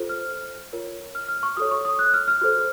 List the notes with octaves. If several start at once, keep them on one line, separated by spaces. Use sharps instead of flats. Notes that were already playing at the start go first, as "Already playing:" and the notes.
Already playing: F4 A4 C5
F6
F4 A#4 C#5
F6
F6
C#6
F#4 A4 C#5 D#6
C#6
D#6
F#6
F6
F6
F#4 A4 C5